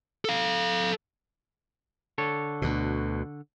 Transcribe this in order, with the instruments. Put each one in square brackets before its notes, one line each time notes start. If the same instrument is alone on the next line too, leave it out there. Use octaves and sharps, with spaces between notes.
[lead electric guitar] A4 F5
[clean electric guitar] D3 A4 C#5
[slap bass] D2 B2